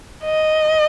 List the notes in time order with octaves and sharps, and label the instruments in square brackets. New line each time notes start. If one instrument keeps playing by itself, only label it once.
[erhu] D#5